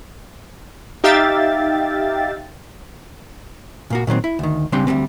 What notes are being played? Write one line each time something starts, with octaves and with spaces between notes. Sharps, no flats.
D#4 G4 E5 F5 G5 A6
A#2 A#3 F#4
A#2 D#3 F#3 C4
E4
D2 D#3
C#3 G3 C4 D4 G5 C6
D2 D#3 G3 C4